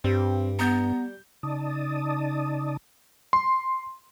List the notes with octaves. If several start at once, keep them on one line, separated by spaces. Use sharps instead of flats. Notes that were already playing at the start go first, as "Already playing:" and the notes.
G2 G3 C4
B3 A#5 G6
C#3 D#4 D5 A5 D#6
C6